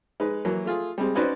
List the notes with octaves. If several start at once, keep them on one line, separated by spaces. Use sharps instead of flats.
G#3 D#4 B4
E3 F#3 A#3
A3 F4 G#4
G3 G#3 C4
C#4 D#4 F#4 B4 C5 D5